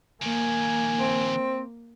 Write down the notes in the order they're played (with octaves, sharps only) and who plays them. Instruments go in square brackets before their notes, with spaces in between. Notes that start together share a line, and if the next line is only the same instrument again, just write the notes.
[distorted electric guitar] D#3 F3 [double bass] A#3 [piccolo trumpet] G#5
[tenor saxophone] C4